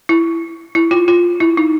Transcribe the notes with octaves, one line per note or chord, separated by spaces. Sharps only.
E4
E4
F4
F4
E4
D#4